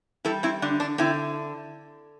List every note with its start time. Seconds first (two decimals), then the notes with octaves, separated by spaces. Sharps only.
0.25 G3 E4 A4
0.43 C4 E4
0.62 D3 D4
0.80 D4
0.98 D3 C4 E4